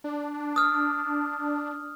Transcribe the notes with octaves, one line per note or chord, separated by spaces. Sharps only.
D4
D#6 F6